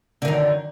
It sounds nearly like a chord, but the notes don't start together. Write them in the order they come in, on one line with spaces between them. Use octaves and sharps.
D3 D#3 F#2